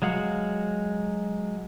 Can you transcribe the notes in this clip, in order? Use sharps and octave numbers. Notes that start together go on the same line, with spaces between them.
F#3 G#3 F5 F#5